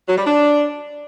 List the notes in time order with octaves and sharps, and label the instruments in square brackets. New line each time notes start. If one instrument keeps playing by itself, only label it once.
[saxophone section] F#3
G3
D4